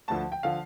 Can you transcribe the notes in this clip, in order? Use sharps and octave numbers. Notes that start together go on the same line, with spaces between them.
D2 D3 F3 A5
G5
D3 F3 F5